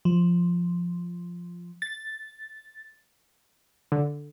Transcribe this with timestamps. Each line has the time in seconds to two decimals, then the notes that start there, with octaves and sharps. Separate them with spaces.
0.05 F3
1.82 A6
3.92 D3